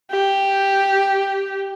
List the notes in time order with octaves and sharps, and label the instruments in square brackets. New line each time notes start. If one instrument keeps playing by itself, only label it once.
[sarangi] G4